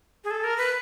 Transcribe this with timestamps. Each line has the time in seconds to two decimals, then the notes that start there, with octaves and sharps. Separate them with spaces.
0.24 G#4
0.31 A4
0.44 A#4
0.58 B4